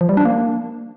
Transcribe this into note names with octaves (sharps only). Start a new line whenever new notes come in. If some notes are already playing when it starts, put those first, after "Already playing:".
F3
G3
D4
A#3